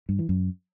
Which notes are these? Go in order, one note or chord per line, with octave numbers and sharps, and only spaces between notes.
G2
E3
F#2